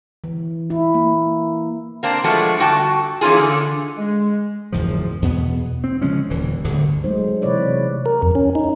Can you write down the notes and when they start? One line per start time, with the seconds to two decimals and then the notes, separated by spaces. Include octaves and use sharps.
0.24 E3
0.70 E4
0.94 A#3
2.03 A#3 C4 D4
2.24 F3 G#3 A3 B3 D4 F#4
2.58 G2 D3 F#4 G5 A5
3.21 E3 A#3 C#4 D#4 F4 G#4
3.37 D3
3.98 G#3
4.72 F#1 E2 G#2 F3
5.22 E2 B2 B3
5.84 C4
6.02 C#3 F3 G#3 C#4
6.30 D#1 D2 E3
6.64 D1 D2 G2 D3
7.04 F#3 G#3 A3 D#4 C5
7.42 C3 E3 E4 B4 C#5 D5
8.06 A#4
8.22 F2
8.35 C#4
8.55 D#4